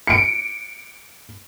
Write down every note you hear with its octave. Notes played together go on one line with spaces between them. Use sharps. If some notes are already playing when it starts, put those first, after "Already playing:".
C#7 D7